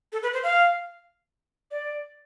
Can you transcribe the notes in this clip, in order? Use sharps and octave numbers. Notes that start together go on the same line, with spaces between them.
A4
B4
C5
F5
D5